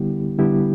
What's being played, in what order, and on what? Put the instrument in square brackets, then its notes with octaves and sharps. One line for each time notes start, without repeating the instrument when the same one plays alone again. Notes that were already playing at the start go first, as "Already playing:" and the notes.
Already playing: [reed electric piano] D3 G3 B3 E4 G4
D3 G3 B3 E4 G4